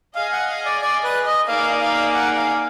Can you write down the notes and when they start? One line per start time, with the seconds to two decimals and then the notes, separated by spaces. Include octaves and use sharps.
0.15 G#4 D#5 F5 G#5
0.32 F#5
0.48 F5
0.65 D5
0.82 D5
1.04 B4
1.26 D#5
1.48 A#3 D#4 G#4 D5 F5 G#5
1.81 F5
2.14 F#5
2.37 F5